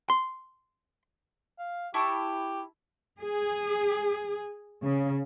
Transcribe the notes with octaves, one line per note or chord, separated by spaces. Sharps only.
C6
F5
E4 G4 A5 C#6
G#4
C#3